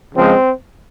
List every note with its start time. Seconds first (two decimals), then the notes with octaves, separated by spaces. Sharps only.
0.15 C#2 C#3 F3 G#3 C4